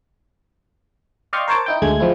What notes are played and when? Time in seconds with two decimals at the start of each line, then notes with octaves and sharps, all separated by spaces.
1.33 D5 D#5 F5 G5 C6 C#6
1.48 A#4 C5 C#5 A5 D6
1.66 D#4 E4 G5
1.82 D2 G#3 A3 G#6
2.00 F3 G#3 C4 E4